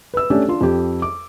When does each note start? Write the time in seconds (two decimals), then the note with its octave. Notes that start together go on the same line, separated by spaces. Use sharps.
0.14 B4 E6
0.30 A3 C#4 D4 G4
0.48 D4 F4 C6
0.61 F2 G4
1.02 D6